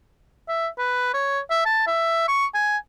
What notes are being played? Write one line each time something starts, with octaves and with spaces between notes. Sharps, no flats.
E5
B4
C#5
E5
A5
E5
C#6
G#5